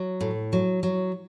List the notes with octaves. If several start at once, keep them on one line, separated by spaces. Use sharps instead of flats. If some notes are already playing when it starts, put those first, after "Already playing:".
Already playing: F#3
A2
F#3
F#3